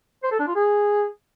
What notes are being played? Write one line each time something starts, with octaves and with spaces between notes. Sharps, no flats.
C5
A4
D4
F4
G#4